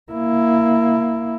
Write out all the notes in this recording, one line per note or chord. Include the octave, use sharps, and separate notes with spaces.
A#3 E4